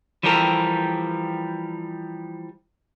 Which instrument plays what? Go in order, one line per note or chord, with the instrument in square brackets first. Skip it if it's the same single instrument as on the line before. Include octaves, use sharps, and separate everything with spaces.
[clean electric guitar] E3 F3 G3 G4 A4 A#4